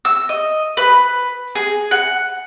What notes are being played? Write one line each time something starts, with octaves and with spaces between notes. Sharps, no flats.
E6
D#5
B4
G#4
F#5